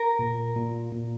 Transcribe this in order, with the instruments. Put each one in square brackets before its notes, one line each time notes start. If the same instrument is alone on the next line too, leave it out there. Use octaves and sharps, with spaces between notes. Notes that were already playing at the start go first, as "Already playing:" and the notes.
Already playing: [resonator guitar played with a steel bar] A#4
[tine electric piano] A#2
A#2
A#2